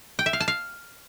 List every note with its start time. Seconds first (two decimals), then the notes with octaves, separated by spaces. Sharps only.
0.19 G5
0.26 E5
0.33 F5
0.40 A5
0.48 F5